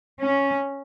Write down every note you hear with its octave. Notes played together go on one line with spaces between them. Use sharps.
C#4